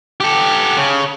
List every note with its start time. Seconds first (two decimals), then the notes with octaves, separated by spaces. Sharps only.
0.20 G4 A4
0.77 C#3